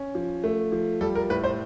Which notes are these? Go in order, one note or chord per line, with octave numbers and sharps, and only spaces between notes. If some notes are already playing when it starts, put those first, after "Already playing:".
Already playing: C#4
F3
A3
F3
G3 A4
A#4
A2 B4
C5